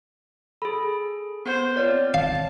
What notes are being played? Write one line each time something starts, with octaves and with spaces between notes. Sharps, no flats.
G#4 A4 B5
B3 C5 F#5
C4 F4 C#5 D5
F5 A5